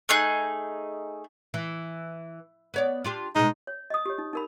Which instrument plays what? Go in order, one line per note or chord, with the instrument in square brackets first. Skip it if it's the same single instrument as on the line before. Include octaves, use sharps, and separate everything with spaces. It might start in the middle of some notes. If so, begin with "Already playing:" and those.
[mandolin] A3 D#4 G#4 F#6
[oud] E3
B3 C#5 D5
D4 F4 G4
[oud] B2 G#3 [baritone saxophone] D#4
[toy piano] C#5
D#5 D#6
G4 C#5
D#4
D#4 A#4 B5